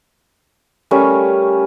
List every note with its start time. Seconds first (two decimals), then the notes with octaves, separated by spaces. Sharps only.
0.91 G3 A3 C#4 A#4